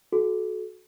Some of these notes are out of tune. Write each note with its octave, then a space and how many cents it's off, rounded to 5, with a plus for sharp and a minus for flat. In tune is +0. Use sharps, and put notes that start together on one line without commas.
F#4 -10 A4 -35